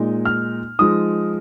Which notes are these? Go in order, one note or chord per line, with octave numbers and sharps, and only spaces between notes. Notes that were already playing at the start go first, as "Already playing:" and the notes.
Already playing: A#2 G#3 D#4
F6
F3 G#3 D#4 D#6